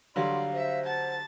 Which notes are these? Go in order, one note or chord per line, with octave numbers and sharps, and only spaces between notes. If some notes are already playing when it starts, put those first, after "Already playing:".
D3 F#3 G3 D5 F5 C6
C5 E5
F#5 A5 A6